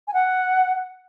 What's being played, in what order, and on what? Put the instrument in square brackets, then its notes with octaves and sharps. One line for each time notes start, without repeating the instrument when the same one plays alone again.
[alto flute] G#5
F#5